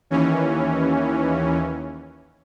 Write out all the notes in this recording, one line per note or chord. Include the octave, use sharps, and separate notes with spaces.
D#2 E3 C#4